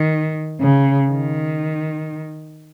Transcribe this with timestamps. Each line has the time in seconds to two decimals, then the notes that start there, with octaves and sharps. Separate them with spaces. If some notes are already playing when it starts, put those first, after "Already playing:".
Already playing: D#3
0.61 C#3
1.11 D#3